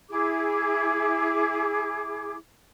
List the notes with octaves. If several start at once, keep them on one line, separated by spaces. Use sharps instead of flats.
E4 G#4 D6